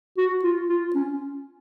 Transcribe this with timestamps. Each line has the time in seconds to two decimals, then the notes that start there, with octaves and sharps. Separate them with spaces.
0.18 F#4
0.43 F4
0.69 F4
0.95 C#4